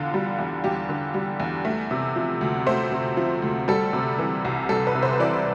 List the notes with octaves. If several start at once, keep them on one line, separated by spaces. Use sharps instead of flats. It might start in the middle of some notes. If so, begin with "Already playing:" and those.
Already playing: E2 D3 F4
G3
E2
E2 G4
D3
G3
E2
A3
C3
F3
D2
A3 C5
C3
F3
D2
G3 A4
C3
E3
C2
G3 A4
B4
C3
C5
E3 D5